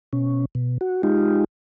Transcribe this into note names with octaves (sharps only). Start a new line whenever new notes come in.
B2 C#4
B2
F#4
G#3 D#4 F4 G4